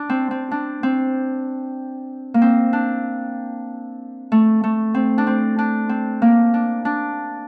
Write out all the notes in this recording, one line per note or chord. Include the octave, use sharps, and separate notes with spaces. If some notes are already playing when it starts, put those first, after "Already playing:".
Already playing: D4
C4
C4
D4
C4
A#3
C4
D4
A3
A3
C4
D4
C4
D4
C4
A#3
D4
D4